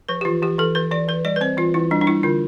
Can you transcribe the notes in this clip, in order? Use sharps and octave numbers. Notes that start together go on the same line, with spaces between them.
F3 B4
G4
E3 F4
E3 G4
E3 A4
E3 B4
E3 D5
E3 B4
G3 D5
B4
C4 C5
E3 F4
E3 E4
G3 D4
D4
G3 E4
D3 F4